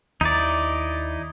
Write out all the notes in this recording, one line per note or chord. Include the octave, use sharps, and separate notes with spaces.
D#2 D#4 E4 D5